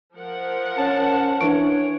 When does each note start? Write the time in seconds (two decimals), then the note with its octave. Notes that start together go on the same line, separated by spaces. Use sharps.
0.15 F3 A#4 F#5
0.78 C#4 A5
1.41 E3 D4 C#5 D7